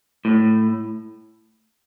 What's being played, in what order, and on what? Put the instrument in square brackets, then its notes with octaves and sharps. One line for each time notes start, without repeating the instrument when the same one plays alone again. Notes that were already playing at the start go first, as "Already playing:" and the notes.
[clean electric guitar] A2